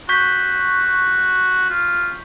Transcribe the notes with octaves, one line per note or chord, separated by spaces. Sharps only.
F#4 C#6 G6 B6
F4